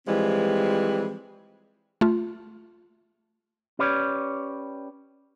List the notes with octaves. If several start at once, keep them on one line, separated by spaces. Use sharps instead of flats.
E3 F3 G3 G#3 C4
A3 F4
C#4 G4 B4 C#5 D5